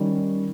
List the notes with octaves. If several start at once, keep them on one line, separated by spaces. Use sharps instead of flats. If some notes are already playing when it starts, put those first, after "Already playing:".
Already playing: D#3 G3 C#4